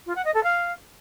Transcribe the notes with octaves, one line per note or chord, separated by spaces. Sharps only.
F4
F#5
D#5
A4
F5